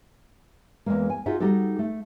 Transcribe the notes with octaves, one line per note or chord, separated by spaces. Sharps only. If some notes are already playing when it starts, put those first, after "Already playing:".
E2 G#3 A#3
G#5
D#4 F4 F#4 G#4 E5
G3 D#4 F#4 G4 A4
A3